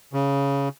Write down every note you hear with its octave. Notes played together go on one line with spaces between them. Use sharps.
C#3